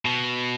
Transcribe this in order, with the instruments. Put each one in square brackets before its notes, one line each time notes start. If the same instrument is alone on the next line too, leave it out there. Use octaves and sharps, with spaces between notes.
[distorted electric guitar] B2